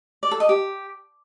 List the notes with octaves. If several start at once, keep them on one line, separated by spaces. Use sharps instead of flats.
D5
A4
D#5
G4